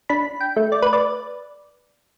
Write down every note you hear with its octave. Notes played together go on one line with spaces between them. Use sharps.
D4 B5
G5
A3
D5
B4
D5